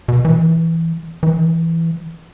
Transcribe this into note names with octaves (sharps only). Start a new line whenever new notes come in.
B2
E3
E3